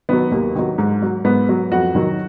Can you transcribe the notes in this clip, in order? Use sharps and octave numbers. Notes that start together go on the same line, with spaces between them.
D#3 F#3 B3
D#2 A#3
D#3 F#3
G#2
F#3
G#2 B3
F#3
F2 F#4
D#3 F#3